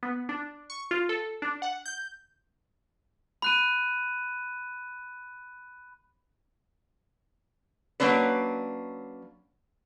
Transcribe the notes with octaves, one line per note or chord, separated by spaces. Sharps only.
B3
D4
C#6
F4
A4
D4
F#5
G6
B5 F#6 D#7
F#3 A#3 C#4 D4 B4